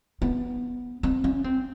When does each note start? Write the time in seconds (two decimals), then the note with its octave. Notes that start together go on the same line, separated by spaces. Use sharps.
0.22 B3
1.03 C4
1.24 C#4
1.44 C4